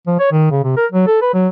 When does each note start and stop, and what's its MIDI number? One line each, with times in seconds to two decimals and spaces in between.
0.07 0.16 53
0.19 0.27 73
0.32 0.47 51
0.51 0.60 49
0.64 0.74 48
0.77 0.86 70
0.92 1.07 54
1.07 1.19 69
1.22 1.33 71
1.34 1.48 54